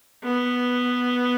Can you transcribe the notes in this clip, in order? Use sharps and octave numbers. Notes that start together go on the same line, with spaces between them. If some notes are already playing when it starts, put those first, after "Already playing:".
B3